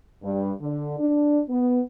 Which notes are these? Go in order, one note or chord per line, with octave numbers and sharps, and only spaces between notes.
G2
D3
D4
B3